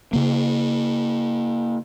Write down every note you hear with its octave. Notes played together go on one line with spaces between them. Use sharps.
C#3 A#3